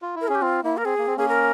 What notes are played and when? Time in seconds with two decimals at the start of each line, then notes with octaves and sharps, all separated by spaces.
0.02 F4
0.16 E4
0.21 A#4
0.28 C#4 G#4
0.35 G4
0.41 C4 F4
0.63 A#3 E4
0.77 A#4
0.85 C4 G#4
0.99 A#3
1.07 C4
1.17 A#3 C#4 G#4
1.28 A#4